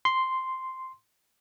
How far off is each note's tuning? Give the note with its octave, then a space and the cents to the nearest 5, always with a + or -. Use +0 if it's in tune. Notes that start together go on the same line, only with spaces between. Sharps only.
C6 -5